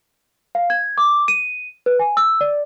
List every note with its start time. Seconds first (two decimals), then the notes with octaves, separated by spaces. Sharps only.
0.55 F5
0.70 G#6
0.98 D6
1.28 D#7
1.86 B4
1.99 G#5
2.17 E6
2.41 D5